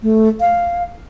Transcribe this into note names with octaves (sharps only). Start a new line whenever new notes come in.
A3
F5